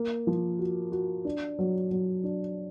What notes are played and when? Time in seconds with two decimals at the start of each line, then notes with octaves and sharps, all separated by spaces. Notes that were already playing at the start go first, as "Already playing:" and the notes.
Already playing: A#3
0.27 F3
0.59 F#4
0.92 F#4
1.25 D4
1.59 F#3
1.91 F#3
2.24 D4